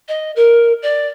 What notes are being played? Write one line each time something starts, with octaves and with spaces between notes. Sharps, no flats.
D#5
A#4
D5